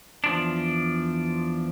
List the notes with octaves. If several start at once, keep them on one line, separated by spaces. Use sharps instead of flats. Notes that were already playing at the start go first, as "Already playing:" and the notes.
E2 F3 D4